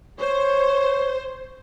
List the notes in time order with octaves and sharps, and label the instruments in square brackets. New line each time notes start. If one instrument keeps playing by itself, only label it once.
[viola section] C5 [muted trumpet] C#5